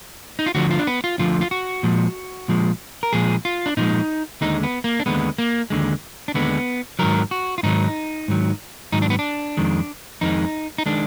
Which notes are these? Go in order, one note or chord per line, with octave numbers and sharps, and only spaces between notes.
D#4
F4
D2 D3 F3 F#4
F4
D4
B3
F4
D2 D3 F3 F4
F4
F#4
A#2 F3 G#3
A#2 F3 G#3
A#4
A#2 F3 G#3 G#4
F4
D4
A#2 F3 G#3 D#4
D#2 D3 G#3 D#4
B3
A#3
D4
D#2 D3 G#3 B3
A#3
D#2 D3 G#3
D4
D#2 D3 G#3 B3
G#2 D#3 F#3 A#4
F#4
F4
G#2 D#3 F#3 D#4
G#2 D#3 F#3
G#2 D#3 F#3 D#4
D4
B3
D4
F2 D#3 G#3
F2 D#3 G#3 D#4
D#4
D#3 G#3 D4